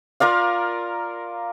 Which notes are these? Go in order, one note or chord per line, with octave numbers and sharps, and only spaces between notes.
F4 A#4 D5 F5